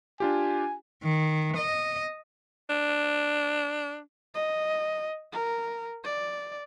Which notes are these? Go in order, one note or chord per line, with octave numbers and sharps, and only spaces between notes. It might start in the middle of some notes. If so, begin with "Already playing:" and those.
D4 F4 G4 G#5
D#3
D#5
D4
D#5
A#4
D5